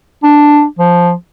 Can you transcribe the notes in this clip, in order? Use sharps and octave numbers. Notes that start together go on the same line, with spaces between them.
D4
F3